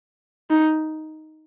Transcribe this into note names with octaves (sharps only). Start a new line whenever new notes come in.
D#4